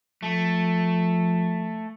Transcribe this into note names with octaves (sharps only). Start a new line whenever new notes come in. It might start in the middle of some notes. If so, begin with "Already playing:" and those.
F3 A3